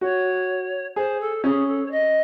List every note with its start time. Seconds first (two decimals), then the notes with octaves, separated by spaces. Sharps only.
0.01 F#4 C#5
0.96 G#4 C5
1.20 A4
1.44 C#4 G#4
1.67 A4
1.85 C#5
1.90 D#5